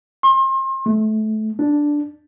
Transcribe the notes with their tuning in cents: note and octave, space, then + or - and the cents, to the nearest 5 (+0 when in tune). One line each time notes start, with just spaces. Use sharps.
C6 +35
A3 -25
D4 +0